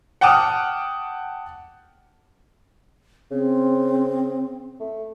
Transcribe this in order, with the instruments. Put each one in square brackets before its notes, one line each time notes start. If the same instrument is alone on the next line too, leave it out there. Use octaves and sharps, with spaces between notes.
[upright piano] F#5 G5 A5 D6 D#6 F6
[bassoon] C#3 [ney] C4
[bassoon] A3